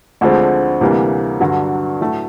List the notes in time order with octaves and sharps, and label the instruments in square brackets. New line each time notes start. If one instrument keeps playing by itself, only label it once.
[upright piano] D2 D3 F3 G#3 C4
D2 C3 E3 G3 A#3
G2 D3 F#3
A2 F#3 A3